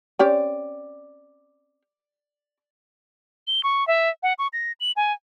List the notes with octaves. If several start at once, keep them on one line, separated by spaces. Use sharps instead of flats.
C4 C#4 G4 D5
G7
C#6
E5
F#5
C#6
A#6
F#7
G#5